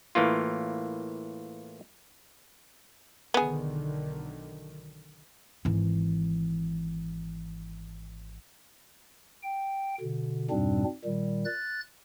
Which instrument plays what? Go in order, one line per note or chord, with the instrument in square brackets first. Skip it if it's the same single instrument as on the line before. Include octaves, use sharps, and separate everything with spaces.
[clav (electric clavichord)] A2 E3 A#3 F4
[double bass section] B1 D3 D#3 [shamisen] B3 G#4
[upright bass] G#1 E3
[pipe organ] G5
B2 D3
F2 G#2 B2 G3 C4 D4
A#2 D#3 G3
F#6 A6